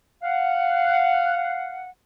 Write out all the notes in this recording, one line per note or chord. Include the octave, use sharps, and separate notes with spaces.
F5 F#5